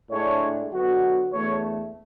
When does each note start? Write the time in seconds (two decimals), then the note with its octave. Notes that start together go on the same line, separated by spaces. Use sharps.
0.10 A2 G#3 D4 C#5
0.71 D3 F#3 B3 F#4
1.33 E2 D3 A3 C#5